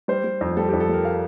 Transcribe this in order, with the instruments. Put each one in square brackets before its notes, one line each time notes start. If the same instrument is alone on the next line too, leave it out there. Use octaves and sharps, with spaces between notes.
[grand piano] G3 C5
G3
F2
G3 A4
F2 G4
A4
G3 A#4
F5